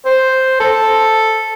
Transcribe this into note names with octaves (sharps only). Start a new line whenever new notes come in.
C5
A4